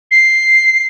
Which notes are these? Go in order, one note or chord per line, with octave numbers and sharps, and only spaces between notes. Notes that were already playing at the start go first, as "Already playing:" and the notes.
C7